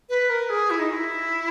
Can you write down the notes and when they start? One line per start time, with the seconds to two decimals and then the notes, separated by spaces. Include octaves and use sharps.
0.09 B4
0.29 A#4
0.49 G#4
0.70 E4
0.79 D#4
0.90 F#4
0.93 E4